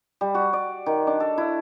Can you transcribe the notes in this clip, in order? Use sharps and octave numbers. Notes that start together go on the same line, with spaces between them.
G3
F#4
D5
D#3
D4
A4
E4